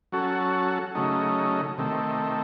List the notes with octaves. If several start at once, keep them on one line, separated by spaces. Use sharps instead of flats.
F#3 C#4 F#4 A4
C#3 F#3 A3 D#4
C3 D#3 A3